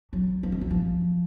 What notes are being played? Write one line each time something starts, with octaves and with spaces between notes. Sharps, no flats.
F#3
A#3
G#3
F#3
F3